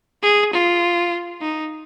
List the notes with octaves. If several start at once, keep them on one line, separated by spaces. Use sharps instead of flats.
G#4
F4
D#4